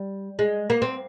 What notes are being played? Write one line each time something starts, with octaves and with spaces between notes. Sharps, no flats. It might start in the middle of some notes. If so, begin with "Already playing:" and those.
Already playing: G3
G#3
A#3
C4